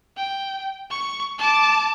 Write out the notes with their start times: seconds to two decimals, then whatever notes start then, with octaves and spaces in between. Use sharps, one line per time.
0.17 G5
0.90 C#6
1.38 A5 D6